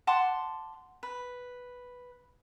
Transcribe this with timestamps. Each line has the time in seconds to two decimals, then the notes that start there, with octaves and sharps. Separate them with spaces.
0.07 F#5 A5 C6 D6
1.03 B4